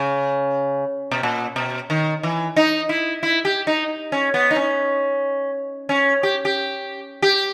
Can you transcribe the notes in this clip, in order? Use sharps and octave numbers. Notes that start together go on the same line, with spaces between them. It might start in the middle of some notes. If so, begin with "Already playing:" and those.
Already playing: C#3
B2
A#2
B2
D#3
E3
D#4
E4
E4
G4
D#4
C#4
B3
D#4
C#4
C#4
G4
G4
G4